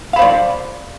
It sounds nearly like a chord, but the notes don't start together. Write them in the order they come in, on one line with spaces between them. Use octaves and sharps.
F5 B5 C5 D5